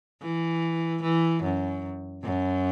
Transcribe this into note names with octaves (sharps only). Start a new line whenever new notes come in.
E3
E3
F#2
F#2